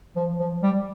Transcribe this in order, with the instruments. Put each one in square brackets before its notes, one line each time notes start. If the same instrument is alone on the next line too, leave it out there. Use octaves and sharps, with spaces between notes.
[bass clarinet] F3
F3
G3